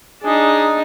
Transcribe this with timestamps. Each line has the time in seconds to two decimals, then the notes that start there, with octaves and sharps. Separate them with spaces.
0.23 D4 D#4 G#4